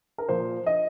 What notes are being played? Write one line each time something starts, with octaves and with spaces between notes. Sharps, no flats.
A#4
A#2 F3 A#3 C5
D#5